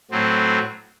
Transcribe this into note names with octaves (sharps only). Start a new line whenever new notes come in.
A2 F#3 C4